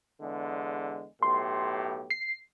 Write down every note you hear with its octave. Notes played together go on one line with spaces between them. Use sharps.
E2 D3 G#3
B1 A2 G4 C6
C7